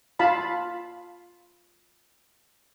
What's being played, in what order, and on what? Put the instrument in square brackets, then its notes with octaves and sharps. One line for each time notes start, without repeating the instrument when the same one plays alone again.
[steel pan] F4 F5 A5 B5